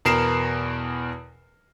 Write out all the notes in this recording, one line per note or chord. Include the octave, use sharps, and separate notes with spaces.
E2 B2 A#4 C7 E7